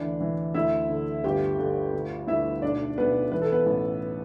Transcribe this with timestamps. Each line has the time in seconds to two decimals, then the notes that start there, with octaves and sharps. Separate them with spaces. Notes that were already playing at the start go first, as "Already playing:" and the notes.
Already playing: D2 D3 E3 D4
0.20 E3
0.54 D2 E4 E5
0.89 D3
1.24 G1 G4 G5
1.58 D3
1.94 D2
2.27 D2 E4 E5
2.62 B1 D4 D5
2.98 B1 B3 B4
3.31 E3 B4
3.41 A4
3.52 B3 B4
3.66 A1